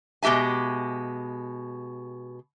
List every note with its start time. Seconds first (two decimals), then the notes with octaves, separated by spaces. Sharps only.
0.23 B2 G#3 G4 E5 G#5